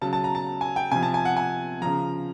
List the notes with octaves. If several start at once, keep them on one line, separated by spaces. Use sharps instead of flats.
C#3 F#3 A5
A5
A#5
A5
G#5
G5
C3 F3 G#5
A5
G#5
F#5
G#5
C#3 F3 A#5